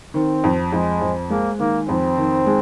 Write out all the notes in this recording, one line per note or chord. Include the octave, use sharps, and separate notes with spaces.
D#3 C4
F2
F2 G#3
F2
G#3 A#3
D#3 A#3
F2 C4
D#3
G#3